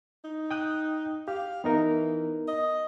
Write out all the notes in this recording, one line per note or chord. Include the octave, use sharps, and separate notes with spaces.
D#4
G5 D#6 F#6
G4 F5
E3 B3 D#4 A#4
D#5